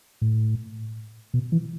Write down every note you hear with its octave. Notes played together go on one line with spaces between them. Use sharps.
A2
B2
E3